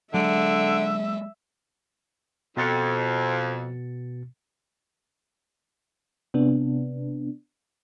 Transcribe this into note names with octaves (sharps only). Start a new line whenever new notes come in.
D3 F#3 G#3 E5
F2 B2 A6 C#7
C3 B3 D4